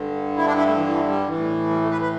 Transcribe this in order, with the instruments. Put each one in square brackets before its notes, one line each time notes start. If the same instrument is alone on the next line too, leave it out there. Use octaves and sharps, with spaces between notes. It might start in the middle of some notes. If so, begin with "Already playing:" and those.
Already playing: [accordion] G2 D3
E4
D4
E4
A3
E3
E3
G3
A2 E3
G3
A3
B4
B4